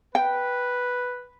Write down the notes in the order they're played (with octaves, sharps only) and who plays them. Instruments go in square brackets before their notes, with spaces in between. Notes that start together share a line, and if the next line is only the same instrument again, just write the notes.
[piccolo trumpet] B4 [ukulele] G5